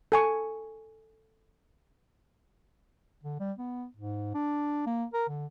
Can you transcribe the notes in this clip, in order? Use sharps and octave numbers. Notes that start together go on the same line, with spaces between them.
A4 G#5 C#6
D3
G3
B3
G#2
D4
A#3
A#4
D3